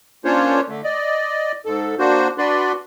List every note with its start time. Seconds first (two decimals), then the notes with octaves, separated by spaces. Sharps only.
0.25 A#3 C#4 D4 F4 C5 C#5
0.69 D3 A3
0.84 D5 D#5
1.65 G#2 A4
1.99 A#3 D4 F#4 C5
2.38 D4 F#4 B4 D5 C6